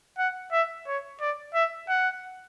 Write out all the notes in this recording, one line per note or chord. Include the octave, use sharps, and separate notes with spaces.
F#5
E5
C#5
D5
E5
F#5